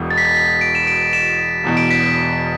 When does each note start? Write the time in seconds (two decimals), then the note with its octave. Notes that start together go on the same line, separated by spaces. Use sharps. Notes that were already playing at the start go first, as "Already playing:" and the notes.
Already playing: E1 E2 B2
0.10 A6
0.18 B6
0.25 A6
0.36 B6
0.61 D7
0.75 E7
0.87 D7
1.13 E7
1.64 E1 E2 B2
1.77 D7
1.91 B6